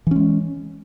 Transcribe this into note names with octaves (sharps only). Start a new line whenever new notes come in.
E3 G#3 C#4